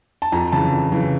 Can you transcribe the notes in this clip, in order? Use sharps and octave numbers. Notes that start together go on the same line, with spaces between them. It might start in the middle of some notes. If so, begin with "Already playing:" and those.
A5
F2 A#5
C#3 E3 A5
F2
C#3 E3